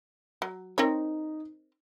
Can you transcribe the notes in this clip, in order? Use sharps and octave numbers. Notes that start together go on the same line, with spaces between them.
F#3
C4 D#4 A#4 C#5